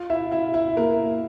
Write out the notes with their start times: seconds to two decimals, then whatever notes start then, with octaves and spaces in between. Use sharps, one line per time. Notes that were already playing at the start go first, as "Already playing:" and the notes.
Already playing: F4 F5
0.10 E4 E5
0.31 E4 E5
0.54 E4 E5
0.77 A#3 A#4